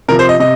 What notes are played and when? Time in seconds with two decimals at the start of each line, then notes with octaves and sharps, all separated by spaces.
0.08 C3 F3 A#4
0.19 C5
0.29 D#5
0.40 C3 D#5